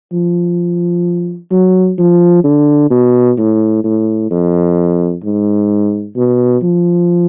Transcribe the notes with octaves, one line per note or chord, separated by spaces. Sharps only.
F3
F#3
F3
D3
B2
A2
A2
F2
G#2
B2
F3